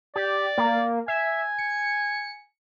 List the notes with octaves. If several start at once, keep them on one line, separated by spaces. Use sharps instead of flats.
G4 D5
A#3
E5 G#5
C#7